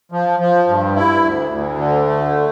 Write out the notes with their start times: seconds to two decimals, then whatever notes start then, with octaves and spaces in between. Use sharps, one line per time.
0.12 F3
0.40 F3
0.67 G2
0.96 E4
1.23 D2
1.51 D2
1.78 D3
2.06 A3